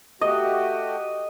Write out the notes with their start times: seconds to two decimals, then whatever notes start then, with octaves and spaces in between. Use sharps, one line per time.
0.21 A3 F#4 G4 D#5